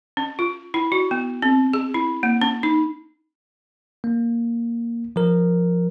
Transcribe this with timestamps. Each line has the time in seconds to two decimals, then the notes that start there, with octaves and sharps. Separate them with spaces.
0.17 C#4
0.39 F4
0.74 E4
0.92 F#4
1.11 B3
1.42 C4
1.73 G#4
1.94 E4
2.23 A#3
2.42 C#4
2.63 D#4
4.04 A#3
5.16 F3 A#4